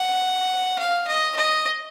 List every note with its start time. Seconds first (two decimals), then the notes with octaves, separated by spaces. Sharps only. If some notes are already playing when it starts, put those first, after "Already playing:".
Already playing: F#5
0.78 F5
1.07 D#5
1.36 D#5